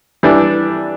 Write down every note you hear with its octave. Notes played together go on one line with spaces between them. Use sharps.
E3 G3 D4